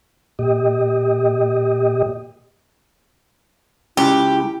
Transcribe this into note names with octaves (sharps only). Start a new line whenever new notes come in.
A#2 G4 D#5
C#2 E4 G4